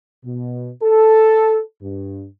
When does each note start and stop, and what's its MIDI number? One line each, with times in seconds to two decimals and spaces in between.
0.24 0.69 47
0.81 1.59 69
1.81 2.25 43